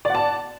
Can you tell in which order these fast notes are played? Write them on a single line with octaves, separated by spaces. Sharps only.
D5 F#5 A5